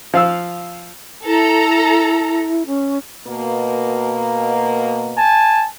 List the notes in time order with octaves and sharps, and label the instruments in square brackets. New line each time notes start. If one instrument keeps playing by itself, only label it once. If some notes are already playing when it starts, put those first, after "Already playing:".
[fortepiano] F3 F5 E6
[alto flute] E4 [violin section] A4 A#5
[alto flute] C#4
[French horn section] B2 A#3
[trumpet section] G#5 A5